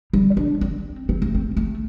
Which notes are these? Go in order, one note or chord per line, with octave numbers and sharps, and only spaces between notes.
G3
D4
C4
C4
A3
C4
A3